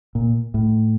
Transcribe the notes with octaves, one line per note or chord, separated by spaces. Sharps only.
A#2
A2